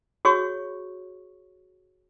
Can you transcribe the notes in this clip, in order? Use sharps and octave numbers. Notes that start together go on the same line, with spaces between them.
F#4 G#4 C#5 C#6